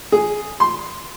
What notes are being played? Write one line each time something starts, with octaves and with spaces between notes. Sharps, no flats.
G#4
C6